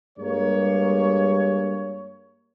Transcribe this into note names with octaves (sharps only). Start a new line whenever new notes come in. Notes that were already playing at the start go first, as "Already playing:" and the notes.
G2 G3 G#3 A#3 C#5